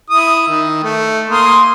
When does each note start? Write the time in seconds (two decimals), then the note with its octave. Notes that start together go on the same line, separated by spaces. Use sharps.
0.10 E4 D#6
0.48 D#3
0.84 A3
1.30 A#3 C6 D#6